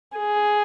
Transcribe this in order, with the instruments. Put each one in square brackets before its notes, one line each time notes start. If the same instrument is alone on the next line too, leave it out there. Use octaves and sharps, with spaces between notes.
[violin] G#4